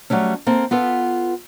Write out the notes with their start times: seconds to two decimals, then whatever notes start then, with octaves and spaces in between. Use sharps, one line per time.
0.10 F#3 G3 A3 C#4
0.47 A#3 C4 A4
0.71 B3 F4 A4 B4